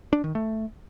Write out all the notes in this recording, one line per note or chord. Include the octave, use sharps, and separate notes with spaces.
D4
D#3
A3